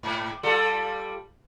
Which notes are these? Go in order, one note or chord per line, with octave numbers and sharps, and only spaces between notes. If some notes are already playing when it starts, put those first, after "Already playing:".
G#2
G3 F4 A4